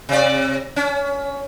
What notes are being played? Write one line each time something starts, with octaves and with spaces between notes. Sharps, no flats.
C3 D5
C#4